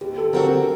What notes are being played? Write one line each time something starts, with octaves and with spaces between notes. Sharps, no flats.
D#2 G4
A4
D3 F#3 C4 F#4 A#4